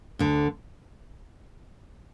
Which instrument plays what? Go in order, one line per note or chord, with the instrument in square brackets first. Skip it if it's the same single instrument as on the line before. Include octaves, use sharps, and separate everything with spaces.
[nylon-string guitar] D2 D3